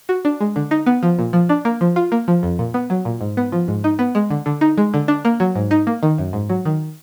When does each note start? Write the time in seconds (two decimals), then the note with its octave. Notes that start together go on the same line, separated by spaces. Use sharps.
0.09 F#4
0.25 D4
0.40 G#3
0.56 D3
0.71 D#4
0.86 B3
1.03 F3
1.19 A#2
1.33 F3
1.49 D4
1.65 A#3
1.81 F3
1.96 F4
2.12 A#3
2.28 F3
2.43 F2
2.59 A#2
2.74 B3
2.90 F#3
3.05 A#2
3.21 G#2
3.37 B3
3.52 F3
3.68 G#2
3.84 D#4
3.99 B3
4.15 G#3
4.30 D3
4.46 D3
4.61 D#4
4.78 G#3
4.94 D3
5.08 D4
5.25 A#3
5.40 F#3
5.55 G#2
5.71 D#4
5.87 A#3
6.03 D#3
6.18 F#2
6.33 G#2
6.49 F#3
6.65 D#3